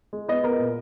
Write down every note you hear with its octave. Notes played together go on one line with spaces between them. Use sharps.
G#3
B3 D#5
B3 A#4
A#2